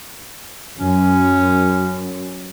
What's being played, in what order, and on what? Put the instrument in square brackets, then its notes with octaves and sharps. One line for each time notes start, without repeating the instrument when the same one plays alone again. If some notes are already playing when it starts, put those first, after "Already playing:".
[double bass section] F#2 [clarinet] C#4